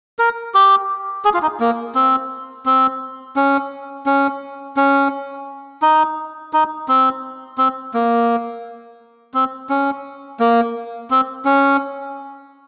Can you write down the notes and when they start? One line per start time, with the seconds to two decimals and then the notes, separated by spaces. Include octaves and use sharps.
0.19 A#4
0.54 G4
1.25 G#4
1.34 F4
1.42 D#4
1.60 A#3
1.95 C4
2.66 C4
3.36 C#4
4.06 C#4
4.77 C#4
5.82 D#4
6.53 D#4
6.88 C4
7.58 C4
7.94 A#3
9.34 C4
9.69 C#4
10.40 A#3
11.11 C4
11.45 C#4